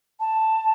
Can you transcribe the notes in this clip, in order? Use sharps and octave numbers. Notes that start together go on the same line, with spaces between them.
A5